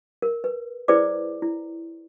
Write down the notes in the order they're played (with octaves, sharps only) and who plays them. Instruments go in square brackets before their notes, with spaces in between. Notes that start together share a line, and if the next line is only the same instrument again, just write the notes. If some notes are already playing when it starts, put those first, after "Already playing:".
[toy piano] A#4
B4
E4 G#4 B4 C5 D5 D6
E4